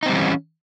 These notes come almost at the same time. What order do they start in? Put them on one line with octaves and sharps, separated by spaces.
D#4 C4 G3 E3 C#4